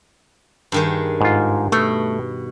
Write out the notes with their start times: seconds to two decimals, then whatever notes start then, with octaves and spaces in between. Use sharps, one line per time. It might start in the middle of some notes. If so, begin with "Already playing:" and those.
0.72 G2 D#3 G#4
1.21 G#2 F4
1.72 B2 A3